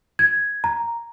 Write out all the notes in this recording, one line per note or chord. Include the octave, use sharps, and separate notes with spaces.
G#6
A#5